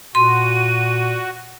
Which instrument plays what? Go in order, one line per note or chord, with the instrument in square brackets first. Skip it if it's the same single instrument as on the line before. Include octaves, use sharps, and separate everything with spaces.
[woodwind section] A#2 [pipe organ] F#4 [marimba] C6 [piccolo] D#7